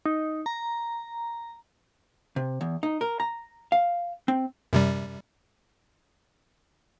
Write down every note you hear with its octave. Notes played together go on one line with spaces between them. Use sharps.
D#4
A#5
C3
E2
D#4
A#4
A#5
F5
C4
F#2 C3 G3